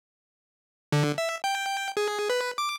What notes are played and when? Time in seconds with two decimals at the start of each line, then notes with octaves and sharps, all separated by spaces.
0.92 D3
1.18 E5
1.44 G5
1.97 G#4
2.30 B4
2.58 D6